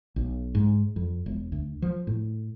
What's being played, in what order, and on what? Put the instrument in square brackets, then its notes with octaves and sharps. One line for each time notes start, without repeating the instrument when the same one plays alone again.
[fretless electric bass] B1
G#2
F2
E1
D2
F3
A2